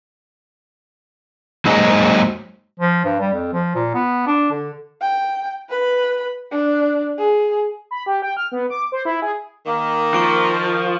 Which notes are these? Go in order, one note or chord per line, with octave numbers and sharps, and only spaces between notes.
F#3 G#3 A#3 D#4 C5 D#5
F3
G2
G3
F2
F3
A#2
B3
D4
D3
G5
B4 B5
D4
G#4
B5
G4
G5
F6
B3
D6
C5
E4
G#4
D#3 A#3
F3 C#6 D7